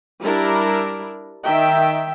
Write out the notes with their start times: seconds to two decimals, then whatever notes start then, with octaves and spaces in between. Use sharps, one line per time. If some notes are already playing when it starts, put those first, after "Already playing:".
0.22 G3 D4 E4 A#4
1.44 D#3 E5 G5